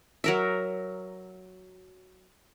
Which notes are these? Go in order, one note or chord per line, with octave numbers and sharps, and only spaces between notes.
F#3 A#4 E5